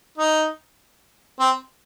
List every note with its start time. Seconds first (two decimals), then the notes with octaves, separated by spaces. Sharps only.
0.18 D#4
1.40 C4